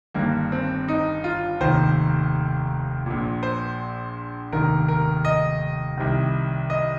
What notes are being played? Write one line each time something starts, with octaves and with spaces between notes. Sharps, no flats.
G1 G2 D#3 A#3
C4
D#4
F4
F1 D#2 D#3 C5
A#1 A#2
C5
F1 D#2 D#3 A#4
A#4
D#5
C2 C3 D#3
D#5